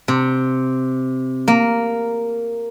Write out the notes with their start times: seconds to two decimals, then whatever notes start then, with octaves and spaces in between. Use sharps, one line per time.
0.08 C3
1.48 A#3